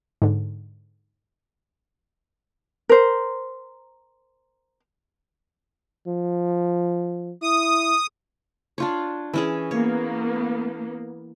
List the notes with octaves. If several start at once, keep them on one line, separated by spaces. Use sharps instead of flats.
G#2 D3
A#4 C5
F3
E4 D#6
D4 F4 C#5
E3 C#4 G#4
A#3 B3 C#5